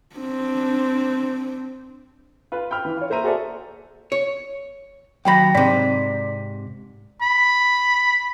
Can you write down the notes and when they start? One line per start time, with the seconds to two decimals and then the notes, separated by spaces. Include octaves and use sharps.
0.16 C4 D4
2.52 F4 B4
2.71 G5 B5 F6
2.85 E3
2.97 F4 C#5
3.10 A#3 C5 E5 A#5 D#7
3.24 F#4 G#4 A4 C5 D5 E5
4.12 C#5
5.25 D#2 F#3 G5 B5 A#6
5.55 G#2 C3 D5 B6
7.22 B5